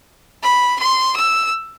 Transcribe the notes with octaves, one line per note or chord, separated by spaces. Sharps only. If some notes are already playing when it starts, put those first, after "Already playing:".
B5
C6
E6